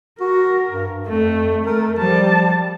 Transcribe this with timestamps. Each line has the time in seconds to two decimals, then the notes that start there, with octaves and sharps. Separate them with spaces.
0.21 F#4 A#4
0.69 G2
1.08 F2 A3
1.66 A3 A#4
1.99 F3 G3 A5